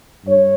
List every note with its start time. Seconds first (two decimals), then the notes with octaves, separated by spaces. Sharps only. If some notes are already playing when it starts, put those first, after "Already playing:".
0.25 G2 C#5